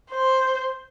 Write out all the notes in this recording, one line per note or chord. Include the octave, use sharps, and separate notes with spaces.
C5